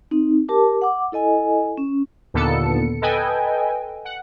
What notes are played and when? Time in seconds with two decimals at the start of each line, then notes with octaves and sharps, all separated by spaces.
0.11 C4 D#4
0.49 G4 A#4 A5 D6
0.82 F#5 D6
1.12 E4 A4 D#5 G#5
1.78 C#4
2.34 D#2 A#2 D3 B3 A4 C#7
3.02 A4 B4 D#5 G5 G#5
4.05 F#5